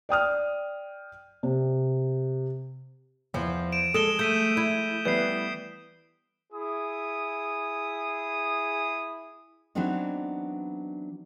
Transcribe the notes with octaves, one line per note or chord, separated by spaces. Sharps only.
D5 G5 D#6 F6
C3
E2 F3
D7 E7
G#3 A4 D#6 E7 G7
A3 G6 B6 D#7
E4
E3 G3 B3 G6 C7
E4 G#4 D#6
E3 F#3 B3 C4 D4 D#4